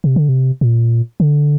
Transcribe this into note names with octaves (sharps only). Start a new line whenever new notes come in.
C3
D3
C3
A#2
D3